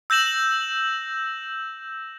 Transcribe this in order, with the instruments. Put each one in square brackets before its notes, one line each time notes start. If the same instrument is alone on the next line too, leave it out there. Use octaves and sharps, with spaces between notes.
[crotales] E6 G6 A#6 E7 F#7